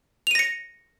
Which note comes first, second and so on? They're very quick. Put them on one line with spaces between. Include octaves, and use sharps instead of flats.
F7 D#7 A#6 C#7